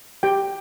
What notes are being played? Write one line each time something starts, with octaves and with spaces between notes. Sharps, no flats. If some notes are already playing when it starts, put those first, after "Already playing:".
G4 G5